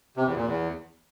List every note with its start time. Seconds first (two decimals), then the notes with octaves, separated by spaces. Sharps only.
0.17 C3
0.26 E2
0.36 A#2
0.46 E2